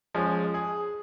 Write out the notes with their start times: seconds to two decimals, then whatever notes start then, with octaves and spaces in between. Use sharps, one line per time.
0.15 F3 G#3 C#4
0.54 G#4